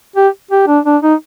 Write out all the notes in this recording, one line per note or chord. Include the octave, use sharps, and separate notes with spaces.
G4
G4
D4
D4
D#4